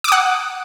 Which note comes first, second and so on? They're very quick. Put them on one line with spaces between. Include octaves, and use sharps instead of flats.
D6 D#6 F#5